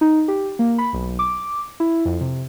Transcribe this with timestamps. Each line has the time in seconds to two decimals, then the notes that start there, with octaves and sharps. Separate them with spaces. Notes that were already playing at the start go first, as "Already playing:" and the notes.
0.01 D#4
0.28 G4
0.59 A#3
0.78 B5
0.93 B1
1.19 D6
1.80 E4
2.05 F2
2.21 C3